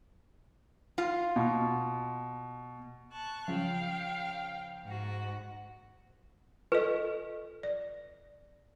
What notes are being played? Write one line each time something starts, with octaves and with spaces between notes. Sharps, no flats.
F4 F5
B2
A5 C#6 F#6
C#3 F3 F5 G5
G#2 F#4
F4 A4 B4 D#5
D5